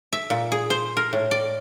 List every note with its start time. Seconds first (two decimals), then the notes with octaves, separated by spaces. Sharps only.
0.13 E5
0.30 A#2
0.52 G#4
0.70 C5
0.97 A#4
1.13 A2
1.31 D5